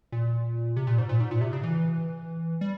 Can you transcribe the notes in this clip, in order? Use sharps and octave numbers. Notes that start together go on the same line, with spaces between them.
A#2
C3
A#2
G#2
A#2
G#2
A#2
C3
C#3
E3
G3